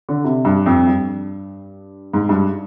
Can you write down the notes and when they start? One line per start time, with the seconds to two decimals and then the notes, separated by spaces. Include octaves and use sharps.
0.09 D3
0.24 C3
0.45 G2
0.66 F2
0.87 G2
2.13 G#2
2.29 G2